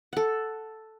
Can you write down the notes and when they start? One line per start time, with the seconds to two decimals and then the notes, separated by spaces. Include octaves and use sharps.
0.13 A4 F#5